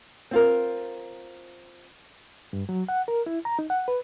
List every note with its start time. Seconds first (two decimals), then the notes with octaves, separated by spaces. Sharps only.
0.31 C4 F4 A#4
2.53 G2
2.69 F#3
2.89 F#5
3.08 A#4
3.26 E4
3.45 A#5
3.59 D#4
3.70 F#5
3.88 B4